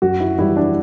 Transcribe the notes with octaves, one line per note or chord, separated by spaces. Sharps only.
F#2 F#4
E4
E3 G3 E4
D4